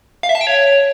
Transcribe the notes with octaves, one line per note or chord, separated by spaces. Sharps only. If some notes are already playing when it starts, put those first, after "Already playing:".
F5
E5
A5
G5
C#5